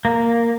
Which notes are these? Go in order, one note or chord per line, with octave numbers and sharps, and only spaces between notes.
A#3